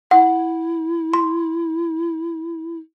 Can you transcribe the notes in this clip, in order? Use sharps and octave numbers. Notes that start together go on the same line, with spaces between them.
E4 F#5
C6